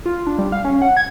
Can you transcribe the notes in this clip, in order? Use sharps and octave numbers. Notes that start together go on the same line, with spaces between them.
F4
D4
G3
F5
C#4
F#5
G#6